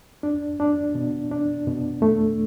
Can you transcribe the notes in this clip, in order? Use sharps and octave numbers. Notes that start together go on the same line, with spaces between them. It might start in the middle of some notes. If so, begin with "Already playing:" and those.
D4
D4
B2
D4
B2
A3